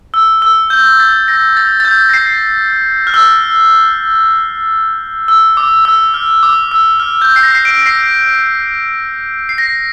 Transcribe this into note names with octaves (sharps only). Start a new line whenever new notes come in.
E6
E6
G6
A6
A#6
A6
A6
G6
A#6
C7
F6
E6
E6
D6
E6
F6
D6
E6
F6
G6
C7
A#6
C7
D7
A#6
C7
C7
A#6